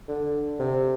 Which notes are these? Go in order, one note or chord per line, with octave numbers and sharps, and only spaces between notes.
D3
C3